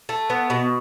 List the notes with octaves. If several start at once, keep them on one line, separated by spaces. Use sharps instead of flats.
A3
B3
B2